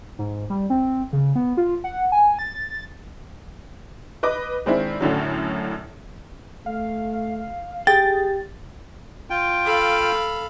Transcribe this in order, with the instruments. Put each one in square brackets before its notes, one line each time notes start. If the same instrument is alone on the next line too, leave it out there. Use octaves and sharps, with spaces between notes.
[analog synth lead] G#2
G3
C4
C#3
B3
F4
F#5
G#5
A6
[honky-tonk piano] B4 D#5 D6
D#3 G#3 C4 D4 E4
F#2 A2 D3 F#3
[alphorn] A3 [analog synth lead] F5
[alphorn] G4 [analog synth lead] G#4 [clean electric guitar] G5 [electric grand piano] A6
[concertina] F4 G5
[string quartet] A4 F5 B5